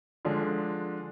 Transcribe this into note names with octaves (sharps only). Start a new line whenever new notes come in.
D3 F3 G#3 D4